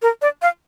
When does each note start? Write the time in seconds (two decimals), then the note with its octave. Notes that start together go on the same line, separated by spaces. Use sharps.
0.02 A#4
0.22 D5
0.42 F5